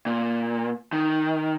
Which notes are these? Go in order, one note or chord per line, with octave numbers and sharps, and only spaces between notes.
A#2
D#3